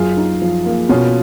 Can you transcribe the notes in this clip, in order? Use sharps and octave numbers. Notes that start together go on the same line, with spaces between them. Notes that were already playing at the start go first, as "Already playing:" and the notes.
Already playing: F#2 F4 G#4
D#4
F3
A#3
B2 C#4 F4